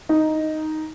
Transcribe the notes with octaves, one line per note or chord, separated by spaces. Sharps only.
D#4